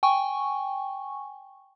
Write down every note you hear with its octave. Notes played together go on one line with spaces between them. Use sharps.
G5 G#5 C#6